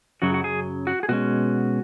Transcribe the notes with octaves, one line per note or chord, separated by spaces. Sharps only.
F#2 C#3 F#3 F#4
F#4
G#4
F#4
G#4
B2 G#3 C#4 F#4